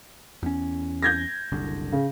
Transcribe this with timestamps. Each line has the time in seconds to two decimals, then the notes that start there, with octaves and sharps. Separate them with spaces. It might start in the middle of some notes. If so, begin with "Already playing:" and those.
0.43 E2 C#4
1.02 G6 G#6 A#6
1.52 F#1 C2 D3
1.92 C#3